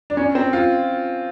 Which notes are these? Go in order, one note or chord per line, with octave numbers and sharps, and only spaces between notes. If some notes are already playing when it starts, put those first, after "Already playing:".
D4
C#4
C4
F4